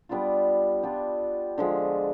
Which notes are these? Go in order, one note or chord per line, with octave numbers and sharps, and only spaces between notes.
G3 B3 D4 F4
G3 B3 D4 F4
D3 F3 G#3